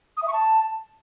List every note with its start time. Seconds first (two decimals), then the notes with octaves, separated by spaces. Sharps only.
0.17 D#6
0.22 E5
0.28 C#6
0.33 A5